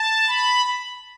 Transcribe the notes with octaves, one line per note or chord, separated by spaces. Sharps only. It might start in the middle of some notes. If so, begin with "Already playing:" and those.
Already playing: A5
B5